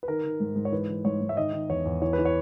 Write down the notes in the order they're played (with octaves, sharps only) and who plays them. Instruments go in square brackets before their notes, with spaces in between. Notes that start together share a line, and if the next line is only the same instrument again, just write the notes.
[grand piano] B4
D#3 A#4
D#3
G#2
G#2
C#5
E3 B4
E3
G#2 C#5
G#2
E5
D#3 D#5
D#3
E2 C#5
E2
E3 C#5
B4
E3
C#5